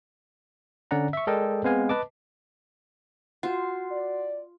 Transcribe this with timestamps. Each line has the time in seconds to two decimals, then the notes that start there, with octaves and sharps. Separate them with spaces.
0.91 D3 C#4 D5 F#5 A#5
1.13 E5 C#6
1.27 G#3 A4 A#4 D5 D#5 G5
1.64 G#3 B3 C4 B4 F5 G#5
1.89 B4 D#5 A5 D6
3.43 F4 F#4 F#5
3.90 D5